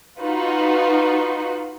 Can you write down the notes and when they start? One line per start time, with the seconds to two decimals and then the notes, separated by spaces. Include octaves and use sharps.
0.20 D#4 F4 F#4 B4